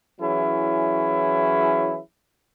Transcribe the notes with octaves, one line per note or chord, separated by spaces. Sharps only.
E3 F#3 C#4 E4 G#4